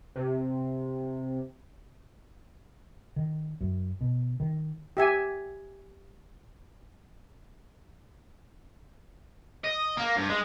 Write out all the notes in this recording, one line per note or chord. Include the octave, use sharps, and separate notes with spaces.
C3
D#3
F#2
B2
D#3
G4 E5 G#5
D#5
A#3
G2
G#3